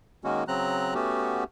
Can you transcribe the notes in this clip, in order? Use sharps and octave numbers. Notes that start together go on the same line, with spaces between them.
D#3 G#3 A#3 C#4 F#4
C#3 F#3 C4 A#5 F#6
A3 B3 C#4 F#4 G4